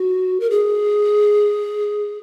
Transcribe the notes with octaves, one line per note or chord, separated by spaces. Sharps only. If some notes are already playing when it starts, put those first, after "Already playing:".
Already playing: F#4
A#4
G#4